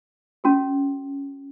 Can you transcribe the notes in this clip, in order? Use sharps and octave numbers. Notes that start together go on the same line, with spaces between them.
C#4 F#4 A4